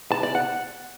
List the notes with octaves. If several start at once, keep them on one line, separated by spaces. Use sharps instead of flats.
A5
D5
F#5